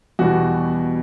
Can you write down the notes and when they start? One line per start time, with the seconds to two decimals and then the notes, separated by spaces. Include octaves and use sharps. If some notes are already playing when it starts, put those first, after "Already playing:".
0.19 E2 B2 G3 F#4